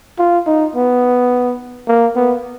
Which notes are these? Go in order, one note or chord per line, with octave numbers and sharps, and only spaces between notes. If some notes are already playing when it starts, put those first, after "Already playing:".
F4
D#4
B3
A#3
B3